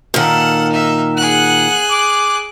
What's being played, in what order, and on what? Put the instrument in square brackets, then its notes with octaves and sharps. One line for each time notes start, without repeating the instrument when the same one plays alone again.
[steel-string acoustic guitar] A#2 D#3 [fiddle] A4 F#5
[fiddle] D#4 E5
[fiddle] G#4 F#6 [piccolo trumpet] F#5
[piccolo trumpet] D6